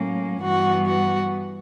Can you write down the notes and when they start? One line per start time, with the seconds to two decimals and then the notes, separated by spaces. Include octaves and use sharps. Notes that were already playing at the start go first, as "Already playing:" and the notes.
Already playing: A2 F#3 A#3 C#4
0.39 G2 E3 G3 B3 F#4
0.85 F#4